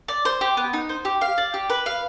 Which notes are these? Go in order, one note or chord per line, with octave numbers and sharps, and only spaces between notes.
D5
C5
G4
B3
D#4
C5
G4
F5
D5
G4
B4
F5